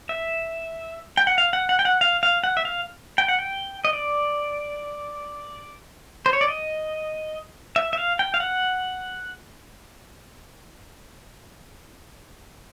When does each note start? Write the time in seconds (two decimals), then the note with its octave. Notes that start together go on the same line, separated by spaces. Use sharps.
0.09 E5
1.17 G5
1.27 F#5
1.38 F5
1.53 F#5
1.69 F#5
1.79 G5
1.85 F#5
2.01 F5
2.23 F5
2.44 F#5
2.57 E5
2.65 F5
3.18 G5
3.28 F#5
3.39 G5
3.85 D#5
3.93 D5
6.26 C5
6.33 C#5
6.41 D5
6.48 D#5
7.76 E5
7.93 E5
7.98 F5
8.19 G5
8.34 F5
8.40 F#5